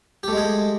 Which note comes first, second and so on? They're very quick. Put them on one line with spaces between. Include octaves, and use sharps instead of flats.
G4 A3 G#3 G#4